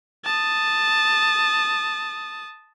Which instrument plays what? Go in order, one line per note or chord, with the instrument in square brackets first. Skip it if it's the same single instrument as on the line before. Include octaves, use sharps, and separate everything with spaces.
[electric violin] A5 D#6